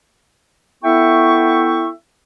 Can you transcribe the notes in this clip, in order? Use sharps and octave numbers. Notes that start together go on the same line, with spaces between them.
B3 E4 A4 E5 G5 C#6